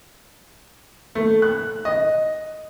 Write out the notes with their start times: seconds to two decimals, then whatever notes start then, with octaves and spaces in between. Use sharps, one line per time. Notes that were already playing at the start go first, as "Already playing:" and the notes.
1.15 A3
1.42 F#6
1.85 D#5